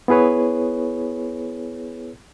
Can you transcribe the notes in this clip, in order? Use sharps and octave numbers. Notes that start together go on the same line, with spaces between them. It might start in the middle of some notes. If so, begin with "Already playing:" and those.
B3 E4 G#4 B4 C#5